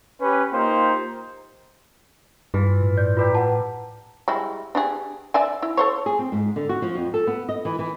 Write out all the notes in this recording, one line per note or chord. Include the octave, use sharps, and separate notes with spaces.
C#4 G4 B4
A#3 D#4 F4 G4 C5
G2 E3 F4
A2
D5 G6
E4 F4 G4 B4 D5 A#5
B4 F#5 A5
G3 G#3 E4
D4 G4 G#4
D5 E5 G#5
E4
A4 C5 C#5
G#4
C4
G#2
D3
F#4
F3
F2
A4
B3
D#5
E3
E3